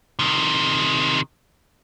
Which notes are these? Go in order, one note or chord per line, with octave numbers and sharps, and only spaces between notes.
C3 D#3